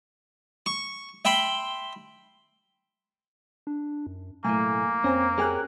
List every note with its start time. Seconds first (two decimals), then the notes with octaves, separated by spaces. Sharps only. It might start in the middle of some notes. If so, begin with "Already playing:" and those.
0.66 C#6
1.25 E5 G5 B5 C6
3.67 D4
4.06 F#2
4.45 B1 A2 A3 A#3 G#5
5.04 F2 C4 C#4 G#5 A#5
5.38 C#4 G4 G#4 A#4 G#5 F#6